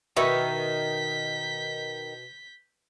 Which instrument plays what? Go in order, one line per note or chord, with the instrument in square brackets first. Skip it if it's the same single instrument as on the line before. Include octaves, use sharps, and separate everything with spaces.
[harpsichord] B2 [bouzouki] D#3 [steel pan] B4 E5 C#6 [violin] G6 B6